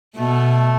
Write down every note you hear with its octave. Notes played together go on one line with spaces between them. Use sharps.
B2 A3